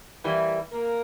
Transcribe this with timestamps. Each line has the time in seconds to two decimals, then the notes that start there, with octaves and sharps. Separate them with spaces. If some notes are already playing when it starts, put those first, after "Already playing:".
0.24 E3 G3 A#3 E4
0.72 A#3 A#4